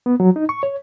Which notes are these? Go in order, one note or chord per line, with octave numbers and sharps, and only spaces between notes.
B3
F#3
D#4
C#6
C#5